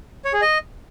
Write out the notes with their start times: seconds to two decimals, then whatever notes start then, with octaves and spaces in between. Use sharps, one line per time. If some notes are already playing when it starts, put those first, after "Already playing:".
0.25 C#5
0.33 G#4
0.42 D#5